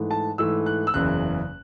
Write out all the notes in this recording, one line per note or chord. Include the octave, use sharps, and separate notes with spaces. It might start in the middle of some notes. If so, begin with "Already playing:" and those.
Already playing: G#2 E3 A3
A5
G#2 E3 A3 E6
F#6
E6
F#1 E2 C#3 F#6